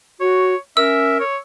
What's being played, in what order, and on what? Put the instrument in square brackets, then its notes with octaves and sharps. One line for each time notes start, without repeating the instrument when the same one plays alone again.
[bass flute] F#4 [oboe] C#5
[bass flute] C#4 [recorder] A#4 [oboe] E5 [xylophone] E6
[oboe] C#5